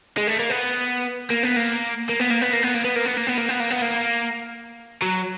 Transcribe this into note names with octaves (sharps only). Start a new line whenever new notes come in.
G#3
A3
A#3
B3
A#3
B3
A#3
A#3
B3
A#3
B3
A#3
B3
A#3
B3
A#3
B3
A#3
B3
A#3
B3
A#3
B3
A#3
F#3